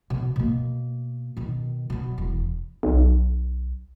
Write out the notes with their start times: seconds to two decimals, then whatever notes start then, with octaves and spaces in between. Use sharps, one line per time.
0.10 B2
0.36 B2 A#3
1.37 B2 D#3
1.90 B2 F#3
2.18 E1
2.83 B1